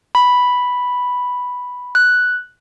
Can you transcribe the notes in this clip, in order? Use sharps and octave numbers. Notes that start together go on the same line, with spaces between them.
B5
F#6